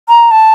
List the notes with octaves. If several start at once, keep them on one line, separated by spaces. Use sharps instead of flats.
A#5
A5